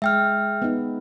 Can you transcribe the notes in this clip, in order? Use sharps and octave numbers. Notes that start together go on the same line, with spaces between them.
G#3 E5 G5 F6
B3 D#4